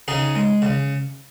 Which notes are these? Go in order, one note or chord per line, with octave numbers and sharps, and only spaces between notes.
C#3 D#4 G#4
G#3
C#3